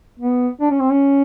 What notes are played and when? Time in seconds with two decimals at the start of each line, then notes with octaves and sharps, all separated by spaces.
0.20 B3
0.61 D4
0.71 C#4
0.80 C4
0.90 C#4